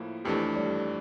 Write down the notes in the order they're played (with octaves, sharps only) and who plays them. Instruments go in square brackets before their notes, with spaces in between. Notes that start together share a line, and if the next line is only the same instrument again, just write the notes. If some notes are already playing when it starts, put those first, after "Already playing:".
Already playing: [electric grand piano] A2 F3 A#3 E4
[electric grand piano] F2 E3 A3 D4 [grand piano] G4
[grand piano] G3